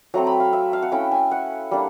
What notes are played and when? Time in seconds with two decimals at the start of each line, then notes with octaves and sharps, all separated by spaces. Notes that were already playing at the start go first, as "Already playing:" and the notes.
0.14 F#3 A3 C4 A#5
0.27 B5
0.40 F5
0.53 E5
0.73 F5
0.82 F#5
0.92 A3 C#4 E4 G5
1.12 G#5
1.31 F#5
1.71 G3 A#3 D4